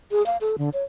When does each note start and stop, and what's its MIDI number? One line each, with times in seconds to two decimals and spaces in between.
0.11 0.25 68
0.26 0.37 77
0.41 0.56 69
0.58 0.70 50
0.73 0.84 73